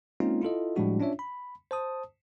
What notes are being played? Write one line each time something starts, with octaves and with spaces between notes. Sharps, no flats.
G#3 A#3 C4 C#4 D#4 F4
E4 F4 A4 D#5
A2 F3 G3 G#3 D4 F#4
C#4 D4 F4 C#5 E5
B5
C5 A5 D#6